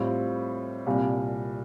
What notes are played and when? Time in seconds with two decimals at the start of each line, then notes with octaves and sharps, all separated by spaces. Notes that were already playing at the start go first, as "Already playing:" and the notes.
Already playing: A2 G3 C4 F4
0.87 C2 A#2 G3